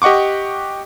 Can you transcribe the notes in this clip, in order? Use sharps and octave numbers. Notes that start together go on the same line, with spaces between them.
G4 D#5 F#5 C#6 D6